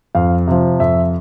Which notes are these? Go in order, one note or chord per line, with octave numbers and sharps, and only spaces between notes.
F2 F5
C3 F3
F2 E5